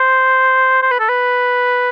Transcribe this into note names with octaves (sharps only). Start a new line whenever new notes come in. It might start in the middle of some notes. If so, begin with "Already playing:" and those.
Already playing: C5
C5
B4
A4
B4